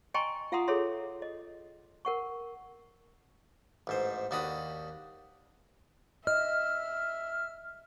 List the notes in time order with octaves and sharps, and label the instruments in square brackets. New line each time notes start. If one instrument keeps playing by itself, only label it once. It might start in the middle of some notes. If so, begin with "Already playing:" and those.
[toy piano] D#5 G5 G#5 A#5 C6 C#6
F4 F5 F#5 A#5 C6 D#6
G#4 A4 C#5 E5 C6
D#5
A#4 F#5 C#6
[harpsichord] A1 G#2 C5
D#2 D4 F#4 B5 D#6
[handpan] D#5 [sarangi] E5 [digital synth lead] F6